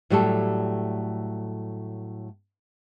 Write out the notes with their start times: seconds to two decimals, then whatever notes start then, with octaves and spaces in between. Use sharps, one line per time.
0.10 A2 F#3 G3 A3 G4 A4